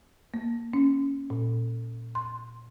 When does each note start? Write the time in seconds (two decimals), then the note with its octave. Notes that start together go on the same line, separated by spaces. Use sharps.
0.34 A#3
0.73 C#4
1.30 A#2
2.15 C6